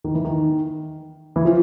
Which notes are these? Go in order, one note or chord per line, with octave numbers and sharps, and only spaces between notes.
D#3
E3
D#3
E3
F3